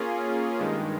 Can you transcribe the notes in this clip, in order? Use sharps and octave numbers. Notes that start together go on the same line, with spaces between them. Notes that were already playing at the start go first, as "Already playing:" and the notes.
Already playing: A#3 C#4 F4 G#4
G2 D#3 G#3